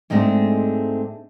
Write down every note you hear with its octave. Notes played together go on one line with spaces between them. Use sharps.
G#2 G#3 A3 C4 D4 E5